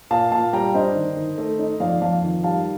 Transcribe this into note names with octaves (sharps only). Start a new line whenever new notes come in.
A#2 F5 A5
A#2 F5 A5
G3 G5 A#5
D4 C5 D#5
D#3
D#3
A3
D#4
F2 D5 F5
F2 F5 A5
D#3
G3 F5 A5